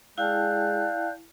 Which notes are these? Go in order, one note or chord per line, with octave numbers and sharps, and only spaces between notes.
G#3 E4 D5 F5 G5 A5 F#6 G6